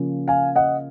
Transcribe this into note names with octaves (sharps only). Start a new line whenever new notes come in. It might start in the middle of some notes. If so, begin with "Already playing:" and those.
Already playing: C#3 F3 A#3 C#4
F5 G#5
D#5 F#5